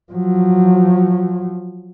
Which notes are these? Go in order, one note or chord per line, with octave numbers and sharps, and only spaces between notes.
F3 F#3